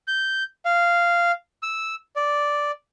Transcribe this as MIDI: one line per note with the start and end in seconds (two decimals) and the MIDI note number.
0.08 0.43 91
0.65 1.32 77
1.63 1.95 88
2.16 2.71 74